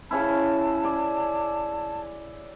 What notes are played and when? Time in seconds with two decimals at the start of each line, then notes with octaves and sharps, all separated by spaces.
0.11 C#3 C#4 E4 A5
0.84 D5 G#5